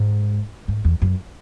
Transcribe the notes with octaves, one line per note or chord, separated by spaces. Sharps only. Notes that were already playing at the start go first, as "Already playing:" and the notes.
Already playing: G#2
G#2
E2
F#2